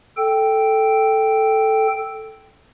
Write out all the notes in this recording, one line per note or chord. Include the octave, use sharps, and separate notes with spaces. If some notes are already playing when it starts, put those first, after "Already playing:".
A4 G5